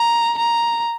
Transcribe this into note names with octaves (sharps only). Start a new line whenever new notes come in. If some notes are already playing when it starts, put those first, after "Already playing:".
Already playing: A#5
A#5